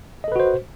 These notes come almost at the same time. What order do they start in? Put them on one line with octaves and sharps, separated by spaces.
D#5 A4 B4 F#4 C5